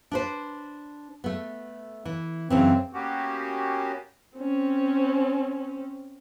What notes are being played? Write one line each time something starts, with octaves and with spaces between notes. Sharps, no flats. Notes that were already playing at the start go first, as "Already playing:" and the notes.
D4 B4 C5
A3 B3
E3
F#2 C#3 E3 C4
A#3 B3 C#4 F#4 G4
C4 C#4